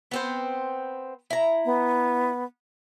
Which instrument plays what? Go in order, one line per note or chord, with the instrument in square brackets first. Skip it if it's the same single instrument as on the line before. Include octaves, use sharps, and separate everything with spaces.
[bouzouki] B3 C4 C5
E4 A#5
[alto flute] B3